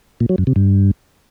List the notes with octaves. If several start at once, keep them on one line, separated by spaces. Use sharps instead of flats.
A#2
F#3
F#2
C3
G2